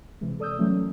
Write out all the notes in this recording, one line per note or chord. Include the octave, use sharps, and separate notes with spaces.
C3 E3 G#3
A4 D5 D#6 E6 G6
E3 F#3 A3 A#3 C#4
A3 A#3